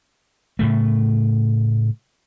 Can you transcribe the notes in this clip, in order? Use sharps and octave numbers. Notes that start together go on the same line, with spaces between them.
A2 C#3 A3